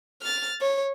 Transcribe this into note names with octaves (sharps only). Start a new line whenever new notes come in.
F6 A6
C#5